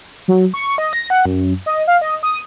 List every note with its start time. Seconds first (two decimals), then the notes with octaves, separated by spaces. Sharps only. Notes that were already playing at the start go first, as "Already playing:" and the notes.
0.28 F#3
0.54 C#6
0.78 D#5
0.93 A#6
1.10 F#5
1.26 F#2
1.66 D#5
1.87 F5
2.01 D#5
2.23 D#6